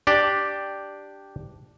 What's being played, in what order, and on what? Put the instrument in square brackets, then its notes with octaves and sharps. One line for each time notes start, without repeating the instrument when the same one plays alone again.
[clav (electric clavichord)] D4 G4 D5 G5